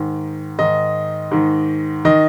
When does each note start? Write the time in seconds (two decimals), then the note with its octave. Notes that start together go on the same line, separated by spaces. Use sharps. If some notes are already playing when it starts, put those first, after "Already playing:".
Already playing: G#2 D#3
0.58 G#2 D#3 D#5
1.31 G#2 D#3
2.05 D#3 D#5